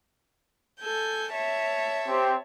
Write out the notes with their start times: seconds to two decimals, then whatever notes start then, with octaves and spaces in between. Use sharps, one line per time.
0.80 A4 G#5 G6
1.32 C#5 E5 A5
2.08 C4 G4